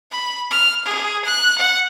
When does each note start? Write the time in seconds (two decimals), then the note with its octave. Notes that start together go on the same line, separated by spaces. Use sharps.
0.11 B5
0.50 F6
0.85 G#4
1.25 F#6
1.58 F#5